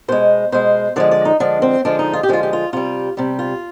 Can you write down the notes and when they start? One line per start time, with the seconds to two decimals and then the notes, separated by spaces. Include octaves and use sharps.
0.08 B2 G#3 C5
0.52 B2 G#3 C5
0.96 D3 F3 G#3 D5
1.11 D5
1.25 D#4
1.40 D3 F3 G#3 D4
1.62 C4
1.85 D3 F3 G#3 D4
1.99 D#4
2.13 F4
2.23 G4
2.29 D3 F3 G#3 F4
2.43 G4
2.53 F4
2.73 C3 G3 F4
3.17 C3 G3
3.39 F4